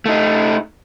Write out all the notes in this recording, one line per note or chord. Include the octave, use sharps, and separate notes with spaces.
A3 D#4